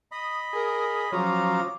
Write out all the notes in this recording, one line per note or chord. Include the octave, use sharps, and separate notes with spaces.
D#5 B5 D#6
G#4 A#4
F3 F#3 C#4 F5 A#5 D6 D#6